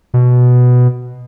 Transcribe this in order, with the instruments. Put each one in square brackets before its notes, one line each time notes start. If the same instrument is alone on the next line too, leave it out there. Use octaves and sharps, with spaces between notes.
[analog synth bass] B2